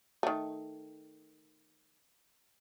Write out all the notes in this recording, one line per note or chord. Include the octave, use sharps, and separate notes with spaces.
D#3 A3